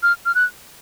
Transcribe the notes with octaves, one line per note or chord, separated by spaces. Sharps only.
F6
F6
F#6